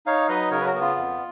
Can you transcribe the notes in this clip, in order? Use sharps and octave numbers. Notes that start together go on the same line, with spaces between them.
D#4 C#5 F5
F#3 B4 D#5
C#3 A#4 C#5
B4
F#4 A#4
B3
F4
F2